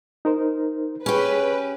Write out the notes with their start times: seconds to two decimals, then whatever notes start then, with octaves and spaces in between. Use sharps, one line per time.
0.25 D#4 A#4 C5
1.06 C#4 G4 G#4 B4 C#5 C#6